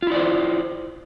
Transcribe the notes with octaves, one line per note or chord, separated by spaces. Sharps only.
E4 F4 C5 D5